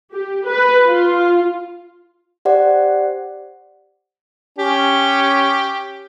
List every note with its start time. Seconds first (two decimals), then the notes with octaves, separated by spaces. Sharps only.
0.14 G4
0.47 B4
0.86 F4
2.45 G4 C5 D5 F#5
4.58 C#4 G4